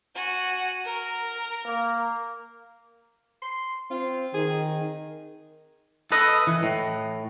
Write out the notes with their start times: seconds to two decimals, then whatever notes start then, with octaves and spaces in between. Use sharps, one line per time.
0.15 F#4 G#5
0.84 A#4
1.65 A#3
3.42 C6
3.91 C4 F4
4.34 D#3 G#4
6.12 A4 B4 D#5
6.47 E3
6.63 A2